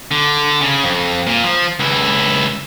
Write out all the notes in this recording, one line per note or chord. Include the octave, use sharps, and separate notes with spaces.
D3
C#3
F2
A#2
F3
C#2 E4